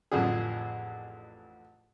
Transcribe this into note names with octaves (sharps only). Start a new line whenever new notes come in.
A1 F2 D3 G#4